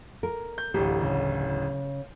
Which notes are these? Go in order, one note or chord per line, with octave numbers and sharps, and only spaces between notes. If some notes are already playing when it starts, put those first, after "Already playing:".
A#4
G6
D1 A1 G4
C#3